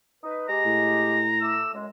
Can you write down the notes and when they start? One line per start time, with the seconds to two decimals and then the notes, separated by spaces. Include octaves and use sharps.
0.24 D#4 B4
0.49 G#3 G4 A#5
0.65 A2
1.41 A3 D6 E6
1.74 F#2 G#3